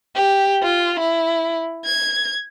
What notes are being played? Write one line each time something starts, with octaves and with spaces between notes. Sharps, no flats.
G4
F4
E4
G#6